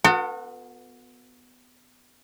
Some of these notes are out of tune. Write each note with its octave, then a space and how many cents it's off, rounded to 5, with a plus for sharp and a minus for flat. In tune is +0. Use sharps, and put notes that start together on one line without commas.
B3 +10 F#4 -35 A4 +45